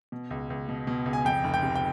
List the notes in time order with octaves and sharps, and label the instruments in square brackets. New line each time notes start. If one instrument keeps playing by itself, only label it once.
[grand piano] B2
C#2
C#2
B2
B2
C#2
G#5
F2 G5
F1
G5
C3
G5